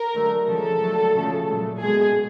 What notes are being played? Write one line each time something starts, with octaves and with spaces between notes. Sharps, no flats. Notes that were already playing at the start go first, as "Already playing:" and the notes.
Already playing: A#4
D3 F#3 A3
C#3 F3 G#3 A4
D3 F#3 A3
C#3 F3 A3
A#2 F#3 A3
B2 G#3 G#4